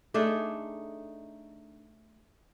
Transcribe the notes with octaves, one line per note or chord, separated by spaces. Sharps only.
A3 D4 D#4 G#4